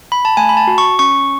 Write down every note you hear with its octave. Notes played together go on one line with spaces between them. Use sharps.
B5
A5
A3 G#5
B5
A5
F#4
C#6
C#4 C#6